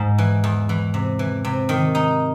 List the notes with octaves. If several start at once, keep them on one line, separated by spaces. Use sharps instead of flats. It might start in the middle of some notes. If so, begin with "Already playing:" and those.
Already playing: G#2
E3
E2
E3
C3
E3
C3
D#3
D#4